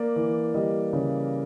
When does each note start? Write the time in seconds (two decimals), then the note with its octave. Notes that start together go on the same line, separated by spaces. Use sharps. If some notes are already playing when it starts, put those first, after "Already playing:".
Already playing: A#3 D5
0.16 E3
0.54 G3 D#5
0.93 C#3